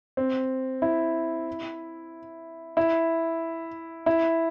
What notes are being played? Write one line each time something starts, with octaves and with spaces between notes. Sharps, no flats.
C4
E4
E4
E4